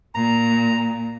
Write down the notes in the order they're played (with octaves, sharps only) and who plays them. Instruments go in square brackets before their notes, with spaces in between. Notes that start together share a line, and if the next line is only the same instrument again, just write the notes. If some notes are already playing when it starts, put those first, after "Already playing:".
[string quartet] A#2 [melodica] A#5